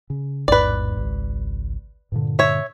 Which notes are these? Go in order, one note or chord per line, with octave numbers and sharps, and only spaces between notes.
C#3
A1 E2 G#2 B4 D5
G#1 C#2
G2 A#2 D3
C#5 E5